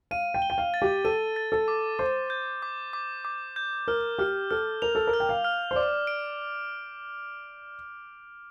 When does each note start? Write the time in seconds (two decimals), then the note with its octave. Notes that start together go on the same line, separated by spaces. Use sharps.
0.11 F5 D#7
0.34 G5
0.42 G7
0.50 G5
0.58 F5
0.74 A6
0.82 G4
1.05 A4 D#7
1.36 A6
1.52 A4
1.68 D6
1.99 C5 D6
2.30 G6
2.62 D6
2.93 D6
3.25 D6
3.56 G6
3.88 A#4 F6
4.18 G4 F6
4.51 A4 F6
4.82 A#4 F7
4.95 A4
5.07 A#4
5.14 F6
5.20 G5
5.29 F5
5.44 F6
5.71 C5
5.76 D5 D6
6.07 D7